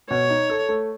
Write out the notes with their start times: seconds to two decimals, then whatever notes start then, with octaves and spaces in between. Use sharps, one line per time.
0.10 B2 C#5
0.30 D#4
0.50 A4
0.69 A3